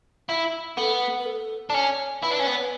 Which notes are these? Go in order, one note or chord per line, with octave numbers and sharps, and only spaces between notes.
E4
B3 A4
B4
A4
D4
C#4
E4 B4
D4
C#4
B3